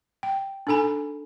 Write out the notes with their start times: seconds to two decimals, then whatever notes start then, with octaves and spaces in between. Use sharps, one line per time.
0.23 G5
0.67 D4 D#4 A4 G#5 B5